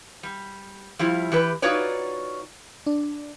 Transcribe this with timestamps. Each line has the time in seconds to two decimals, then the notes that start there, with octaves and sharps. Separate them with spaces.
0.23 G3
0.99 F3 G3 E4 F4
1.32 E3 G4 B4
1.62 D#4 F4 F#4 B4 C#5 D5
2.86 D4